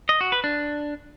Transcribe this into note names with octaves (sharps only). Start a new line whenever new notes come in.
D#5
F#4
B4
D4